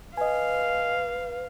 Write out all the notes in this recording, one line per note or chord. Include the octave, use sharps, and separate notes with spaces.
B4 D#5 F5 G#5